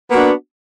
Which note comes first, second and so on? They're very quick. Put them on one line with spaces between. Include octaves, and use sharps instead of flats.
B3 A#3 F#4 D4